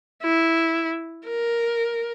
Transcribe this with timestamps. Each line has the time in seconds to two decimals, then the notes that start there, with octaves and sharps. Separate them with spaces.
0.23 E4
1.27 A#4